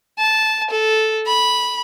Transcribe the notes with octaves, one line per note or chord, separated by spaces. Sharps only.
A5
A4
B5